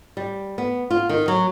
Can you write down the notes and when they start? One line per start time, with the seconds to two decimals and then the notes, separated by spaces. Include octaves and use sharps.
0.17 G3
0.58 B3
0.90 F4
1.09 D#3
1.28 F#3